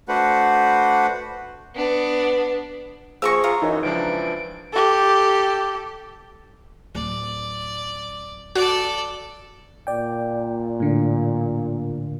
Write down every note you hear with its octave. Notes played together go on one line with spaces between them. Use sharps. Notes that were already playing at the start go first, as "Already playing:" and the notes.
A3 D4 F#4 B4 C5 F#5
B3 D4
F3 A#3 G#4 A#5 C#6 E6 A#6
F4 A#5
F#2 E3 D#4
C#2 E3 F3 D4 D7
G4 A4
D1 D5
F#4 A4 D5
A#2 D5 G5
A2 D3